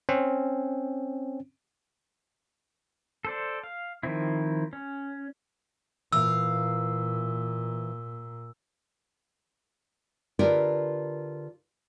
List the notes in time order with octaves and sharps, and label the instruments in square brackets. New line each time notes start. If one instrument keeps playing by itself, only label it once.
[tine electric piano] C4 C#4
[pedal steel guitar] A4 C5 D5
F5
D#3 F3 C4 E4
C#4
[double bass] A#2 [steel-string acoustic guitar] E3 F5 [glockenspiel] E6
[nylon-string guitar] D3 F4 G4 A#4 B4 E5